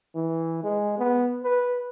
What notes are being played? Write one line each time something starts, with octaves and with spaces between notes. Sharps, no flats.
E3
G#3
B3
B4